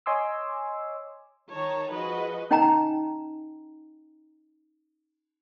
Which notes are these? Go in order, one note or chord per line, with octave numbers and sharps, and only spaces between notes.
C#5 D#5 G#5 C6 D6 E6
D#3 D#4 C#5 A5 A#5
F3 F#4 G#4 B4 D#5
C#4 D#4 D#5 G5 G#5 A#5